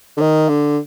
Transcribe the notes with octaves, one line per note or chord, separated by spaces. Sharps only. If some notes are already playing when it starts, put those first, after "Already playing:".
D3
D#3
D3